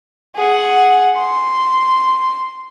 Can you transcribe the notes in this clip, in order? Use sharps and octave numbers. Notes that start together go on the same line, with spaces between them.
G#4 F#5
C6